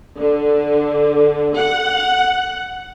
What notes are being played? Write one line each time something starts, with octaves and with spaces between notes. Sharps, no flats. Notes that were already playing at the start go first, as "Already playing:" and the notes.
D3
F#5